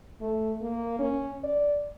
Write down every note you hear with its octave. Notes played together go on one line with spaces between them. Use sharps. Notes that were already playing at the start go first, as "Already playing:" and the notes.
A3
A#3
C#4
D5